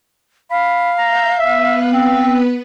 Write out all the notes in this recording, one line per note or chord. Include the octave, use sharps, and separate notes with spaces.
F5 B5
E5 A#5 G6
B3 B4 E5
C4